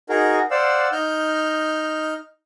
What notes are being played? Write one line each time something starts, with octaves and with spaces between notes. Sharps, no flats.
D#4 F#4 G#4 A#4
C5 D5 F5 F#5 E6
D#4 F6 G6